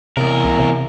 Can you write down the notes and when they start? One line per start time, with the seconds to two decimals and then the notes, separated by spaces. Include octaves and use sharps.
0.17 E2 C3 A#4
0.44 C2
0.59 C3